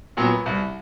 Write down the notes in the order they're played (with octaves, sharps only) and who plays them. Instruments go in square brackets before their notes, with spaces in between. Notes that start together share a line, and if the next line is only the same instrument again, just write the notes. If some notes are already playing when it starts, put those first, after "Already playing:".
[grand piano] A#2 F#3 B3
C2